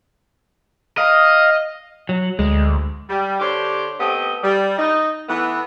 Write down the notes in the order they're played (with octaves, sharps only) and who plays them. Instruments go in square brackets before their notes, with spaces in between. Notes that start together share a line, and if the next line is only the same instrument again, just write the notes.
[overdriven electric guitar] D#5 [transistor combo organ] F5
[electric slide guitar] F#3
[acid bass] D2 [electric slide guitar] G#3
[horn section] G3
D3 D4 G4 C5 C#5
A3 B3 C4 G4 D#5
G3
D#4
E3 A3 B3